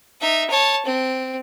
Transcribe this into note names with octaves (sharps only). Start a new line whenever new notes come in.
D#4 E5
C#5 A5
C4